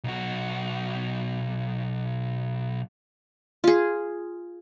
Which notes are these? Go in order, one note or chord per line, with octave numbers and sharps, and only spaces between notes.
B1 F#4
F4 G#4